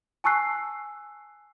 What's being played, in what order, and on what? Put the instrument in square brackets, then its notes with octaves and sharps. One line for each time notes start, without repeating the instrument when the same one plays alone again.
[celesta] G#5 A5 C#6 E6 F#6 C7